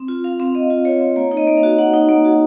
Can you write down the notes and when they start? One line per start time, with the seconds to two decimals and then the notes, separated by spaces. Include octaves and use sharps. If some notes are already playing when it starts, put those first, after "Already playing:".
Already playing: C4
0.08 F4
0.24 F4 F5
0.40 C4 F5
0.55 C4 D#5
0.70 F4
0.85 F4 C#5
1.01 C4
1.16 A#3 C#5
1.31 D#4
1.37 D#5
1.48 A#3
1.57 F5
1.63 F#4
1.78 A#3 F#5
1.93 D#4
2.09 A#3
2.25 F#4